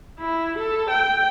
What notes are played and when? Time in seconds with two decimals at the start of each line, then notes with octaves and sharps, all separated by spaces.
0.20 E4
0.58 A4
0.90 G5